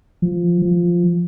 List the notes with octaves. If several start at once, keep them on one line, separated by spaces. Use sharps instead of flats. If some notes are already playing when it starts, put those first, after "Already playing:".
F3
F3